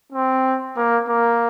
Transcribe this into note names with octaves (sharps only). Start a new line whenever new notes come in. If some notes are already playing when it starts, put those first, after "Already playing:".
C4
A#3
A#3